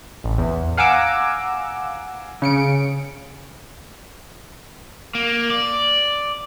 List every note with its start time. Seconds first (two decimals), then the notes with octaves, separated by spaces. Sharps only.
0.24 A1
0.38 E2
0.77 F5 F#5 G#5 A#5 D6 E6
2.42 C#3 C#7 D7
5.15 A#3
5.50 D5